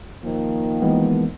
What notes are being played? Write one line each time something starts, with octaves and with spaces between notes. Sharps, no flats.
D#3 F3 A#3
E3 G#3 B3